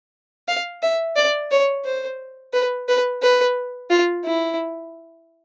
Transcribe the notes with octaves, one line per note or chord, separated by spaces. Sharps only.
F5
E5
D5
C#5
C5
B4
B4
B4
F4
E4